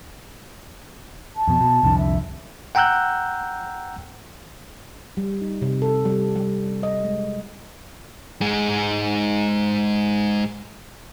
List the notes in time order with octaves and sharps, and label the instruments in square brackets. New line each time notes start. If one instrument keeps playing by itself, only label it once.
[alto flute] A5
[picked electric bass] F2 B2
B2
C2 F2 D3
[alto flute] E5
[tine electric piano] F#5 G5 A#5 E6 F#6 G6
[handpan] G3
D#4
C3
A4
G3
G3
D#5
G#3
[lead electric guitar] G#2 G#3